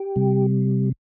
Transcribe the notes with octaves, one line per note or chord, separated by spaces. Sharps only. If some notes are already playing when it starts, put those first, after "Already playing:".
Already playing: G4
C3 G3